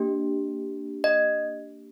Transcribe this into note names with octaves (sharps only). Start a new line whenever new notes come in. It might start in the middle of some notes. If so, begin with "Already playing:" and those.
Already playing: A#3 D4 G4
D#5